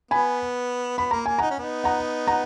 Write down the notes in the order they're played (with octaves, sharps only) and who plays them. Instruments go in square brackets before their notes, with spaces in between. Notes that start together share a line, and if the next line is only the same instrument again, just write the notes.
[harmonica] B3 [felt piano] G#5 B5
[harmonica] B3 [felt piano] B5
[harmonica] A#3 [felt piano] A#5
[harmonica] A#3 [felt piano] G#5
[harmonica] D#4 [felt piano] F#5 A#5
[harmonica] C#4
B3 D#4
[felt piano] F#5 A#5
F#5 A#5